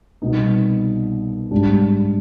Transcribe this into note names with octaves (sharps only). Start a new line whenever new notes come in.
C2 B2 B3 D#4
G#2 G3 D4 G4